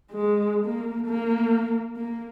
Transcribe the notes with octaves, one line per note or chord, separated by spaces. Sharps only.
G#3
A#3
A#3
A#3